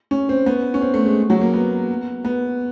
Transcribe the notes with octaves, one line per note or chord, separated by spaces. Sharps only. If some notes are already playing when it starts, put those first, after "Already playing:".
C#4
C4
B3
C#4
C4
A3
G#3
F#3
A#3
B3
B3